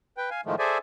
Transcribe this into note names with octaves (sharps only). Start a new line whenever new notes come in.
B4 G5
F5 G#5
A2 D#3 F3 G#3 A3
G#4 A4 C5 D5 E5 G#5